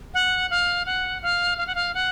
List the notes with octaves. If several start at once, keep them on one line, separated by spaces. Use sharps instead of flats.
F#5
F5
F#5
F5
F5
F#5
F5
F#5